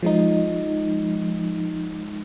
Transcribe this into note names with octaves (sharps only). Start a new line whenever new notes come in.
F3 G#3 D#4